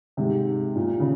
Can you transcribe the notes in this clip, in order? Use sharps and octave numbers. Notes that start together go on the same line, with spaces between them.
G#2 C3
A#2
C#3